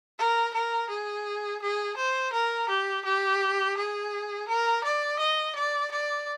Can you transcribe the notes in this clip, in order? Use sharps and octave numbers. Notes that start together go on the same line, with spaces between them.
A#4
A#4
G#4
G#4
C5
A#4
G4
G4
G#4
A#4
D5
D#5
D5
D5